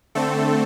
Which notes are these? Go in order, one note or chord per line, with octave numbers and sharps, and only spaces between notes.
D3 A3 C4 A4